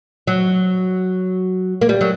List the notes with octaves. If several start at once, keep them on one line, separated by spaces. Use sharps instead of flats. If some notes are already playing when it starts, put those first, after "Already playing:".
F#3
A#3
G3
F#3